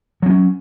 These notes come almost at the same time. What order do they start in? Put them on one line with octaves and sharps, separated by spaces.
F#3 C4 C#4